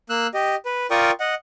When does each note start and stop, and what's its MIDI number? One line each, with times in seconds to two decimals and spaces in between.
0.10 0.27 58
0.10 0.27 88
0.10 0.27 90
0.34 0.56 67
0.34 0.56 75
0.65 0.87 71
0.91 1.11 65
0.91 1.11 70
0.91 1.11 74
0.91 1.11 79
0.91 1.11 85
0.91 1.11 87
1.20 1.35 75
1.20 1.35 78